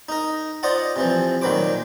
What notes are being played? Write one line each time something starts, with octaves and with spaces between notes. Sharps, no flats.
D#4 A#4
F4 C5 D5 D#5 F#5
C3 E3 F3
A#2 D#3 F#3 B4 C5 D6